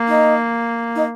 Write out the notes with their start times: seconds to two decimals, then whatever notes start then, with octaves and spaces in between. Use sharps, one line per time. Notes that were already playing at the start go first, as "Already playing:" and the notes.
Already playing: A#3
0.08 D#4
0.95 D#4